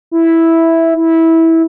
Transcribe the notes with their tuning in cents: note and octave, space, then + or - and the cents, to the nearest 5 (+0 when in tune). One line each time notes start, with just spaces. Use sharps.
E4 -5
E4 -15